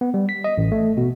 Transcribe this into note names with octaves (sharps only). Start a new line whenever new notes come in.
B3
G3
B6
D#5
A1
A3
B2